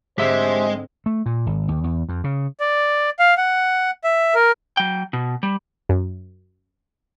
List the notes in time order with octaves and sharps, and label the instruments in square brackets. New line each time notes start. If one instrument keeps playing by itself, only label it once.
[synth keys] G#2 D3 C4 [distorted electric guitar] G#3 [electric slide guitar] G4 E5 [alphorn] C5
[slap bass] A3
A#2
G#1
D#2
E2
F2
C#3
[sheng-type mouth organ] D5
F5
F#5
E5
A#4
[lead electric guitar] F#3 G5
B2
G3
[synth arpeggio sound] F#2